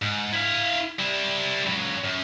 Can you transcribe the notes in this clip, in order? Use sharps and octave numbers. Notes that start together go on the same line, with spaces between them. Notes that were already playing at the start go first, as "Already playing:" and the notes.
G#2
E4 F5
G3 E4
C#2 F#3
F#2